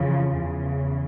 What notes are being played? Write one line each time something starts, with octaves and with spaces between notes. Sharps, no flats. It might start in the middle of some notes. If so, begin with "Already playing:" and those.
Already playing: F2 C#3 E3 F3
E2 C#3 E3